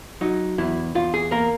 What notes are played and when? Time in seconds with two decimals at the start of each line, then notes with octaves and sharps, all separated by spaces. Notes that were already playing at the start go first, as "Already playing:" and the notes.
0.21 F#3 D#4
0.58 E2 E4
0.95 E2 F4
1.14 G#4
1.31 A#3 A#4